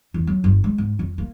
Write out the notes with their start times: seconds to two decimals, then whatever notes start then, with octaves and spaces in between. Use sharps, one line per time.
0.14 E2
0.27 F#3
0.44 G1
0.64 G#3
0.78 G#2
0.99 F2
1.18 A#3